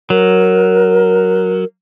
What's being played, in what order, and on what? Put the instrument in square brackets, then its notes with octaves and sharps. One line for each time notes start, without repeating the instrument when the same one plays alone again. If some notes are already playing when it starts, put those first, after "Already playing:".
[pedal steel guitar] F#3 [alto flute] A#4